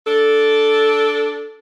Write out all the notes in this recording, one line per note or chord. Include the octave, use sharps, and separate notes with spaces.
D4 A4